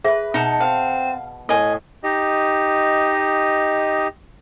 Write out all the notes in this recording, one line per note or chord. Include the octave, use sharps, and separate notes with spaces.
G#4 B4 C5 E5
B2 D#4 F#5 A5
C4 F5
A2 D#5 G#5
D#4 G4 D#5